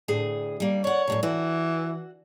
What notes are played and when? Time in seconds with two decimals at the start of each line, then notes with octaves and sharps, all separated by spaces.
0.08 D2 A2 G#4
0.60 G3 A#3
0.84 C#5 D5 F#5
1.07 F#2 A2 C3
1.23 E3 F#4